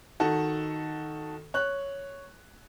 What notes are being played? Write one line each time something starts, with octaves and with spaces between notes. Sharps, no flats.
D#3 F#4 A4
C#5 F#6